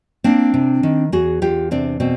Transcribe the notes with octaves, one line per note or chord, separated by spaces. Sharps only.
A#3 C4 D4
C3
D#3
E2 F#4 G#4
E2 F4 G4
C3 C4 D4
B2 C4